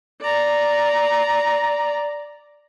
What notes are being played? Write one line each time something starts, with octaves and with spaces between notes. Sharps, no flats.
D5 A#5